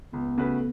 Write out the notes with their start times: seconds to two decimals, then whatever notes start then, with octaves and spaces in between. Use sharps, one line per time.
0.13 C#2 B3
0.38 C#3 A3 F#4 B4